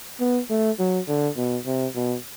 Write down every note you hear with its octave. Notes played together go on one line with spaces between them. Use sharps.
B3
A3
F#3
D3
B2
C3
B2